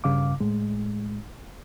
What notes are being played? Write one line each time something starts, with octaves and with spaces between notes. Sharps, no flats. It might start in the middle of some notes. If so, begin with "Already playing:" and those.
G2 C#3 F5 D6
A2 G#3